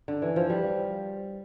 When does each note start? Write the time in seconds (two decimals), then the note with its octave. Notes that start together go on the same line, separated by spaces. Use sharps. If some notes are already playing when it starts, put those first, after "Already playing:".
0.08 D3
0.22 E3
0.36 F3
0.50 G3